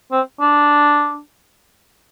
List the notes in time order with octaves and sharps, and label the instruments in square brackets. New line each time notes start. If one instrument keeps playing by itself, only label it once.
[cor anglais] C4
D4